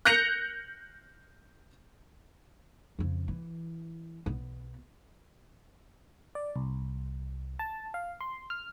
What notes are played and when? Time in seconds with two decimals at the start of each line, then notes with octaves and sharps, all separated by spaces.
0.05 F#6 G6 A#6 C#7 F7
2.99 F2 C#3
3.28 E3
4.26 B1 B3
6.35 D5
6.56 C2
7.59 A5
7.94 F5
8.21 C6
8.50 F6